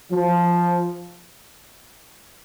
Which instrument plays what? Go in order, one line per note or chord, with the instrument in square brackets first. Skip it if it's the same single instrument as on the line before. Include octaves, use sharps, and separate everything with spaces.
[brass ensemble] F3